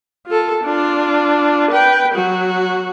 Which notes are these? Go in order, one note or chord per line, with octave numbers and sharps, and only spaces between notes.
F4 A4
D4 F4
B4 G5
F#3 F#4